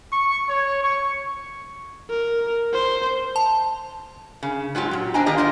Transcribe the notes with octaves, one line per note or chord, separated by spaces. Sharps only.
C#6
C#5
C#6
A#4
C5
A5
C#3
G#2 F#3 F4 G4
A#2 F#3
D4 C5 D#5 G5 G#5 A#5
D#3 A#3 G4 D5 D#5
F4 A#4 C5 D#5 F5